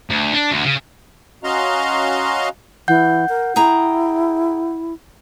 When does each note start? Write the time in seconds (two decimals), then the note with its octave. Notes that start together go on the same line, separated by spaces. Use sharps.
0.10 D2
0.33 D4
0.51 D2
0.65 C#3
1.44 C#4 F#4 D#5 F5 A#5 C6
2.88 E3 F#5 G6
3.29 A#4
3.56 E4 G#4 G5 A#5